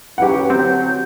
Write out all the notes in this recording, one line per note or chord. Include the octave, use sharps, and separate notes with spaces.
E3 F#3 C#4 E4 F#4 G4 B4 F#5
D3 F#3 C4 G6